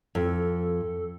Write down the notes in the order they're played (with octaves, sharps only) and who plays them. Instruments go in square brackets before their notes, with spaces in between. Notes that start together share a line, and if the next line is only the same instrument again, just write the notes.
[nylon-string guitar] F2 [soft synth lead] A4